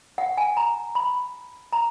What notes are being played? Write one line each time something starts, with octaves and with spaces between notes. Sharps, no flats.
F#5
G#5
A#5
B5
A#5